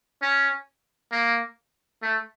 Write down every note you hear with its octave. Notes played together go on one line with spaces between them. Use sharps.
C#4
A#3
A3